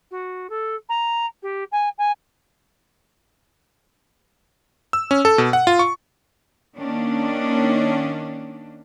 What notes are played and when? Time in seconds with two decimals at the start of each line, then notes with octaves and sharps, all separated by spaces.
0.11 F#4
0.49 A4
0.89 A#5
1.42 G4
1.71 G#5
1.98 G#5
4.93 E6
5.11 C#4
5.25 A4
5.38 B2
5.53 F#5
5.67 F4
5.79 C#6
6.77 D#3 A#3 C#4 D4